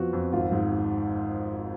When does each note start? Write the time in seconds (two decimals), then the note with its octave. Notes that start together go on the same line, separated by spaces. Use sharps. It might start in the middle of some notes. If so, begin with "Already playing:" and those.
Already playing: F2 F3 B3 F#4
0.13 F2
0.33 G#1 F4
0.52 G#2